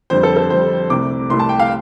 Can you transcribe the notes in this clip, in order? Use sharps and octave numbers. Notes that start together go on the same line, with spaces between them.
F2 D3 G3 C5
A4
A4
F2 D3 G3 C5
C2 C3 A3 D6
C2 C3 A3 C6
A5
G5
F5